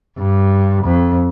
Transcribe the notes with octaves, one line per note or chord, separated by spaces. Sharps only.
G2
F2